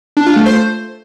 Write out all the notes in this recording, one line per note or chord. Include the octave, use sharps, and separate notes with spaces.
D4
F4
A3
C5